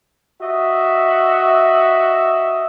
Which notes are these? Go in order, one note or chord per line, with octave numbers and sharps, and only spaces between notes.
F#4 D#5 E5